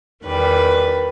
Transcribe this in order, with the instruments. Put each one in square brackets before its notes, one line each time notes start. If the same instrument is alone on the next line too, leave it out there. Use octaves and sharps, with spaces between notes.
[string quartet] E2 D#3 G3 B4